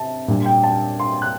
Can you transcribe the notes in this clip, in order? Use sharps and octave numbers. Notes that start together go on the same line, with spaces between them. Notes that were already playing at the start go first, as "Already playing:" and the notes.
Already playing: C3 A5
A#2 G3 D4
G5
A5
C6
F#6